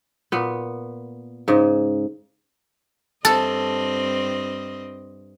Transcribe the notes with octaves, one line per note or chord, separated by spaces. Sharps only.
A#2 B3
G#2 C#3
G2 C4 A4 D#5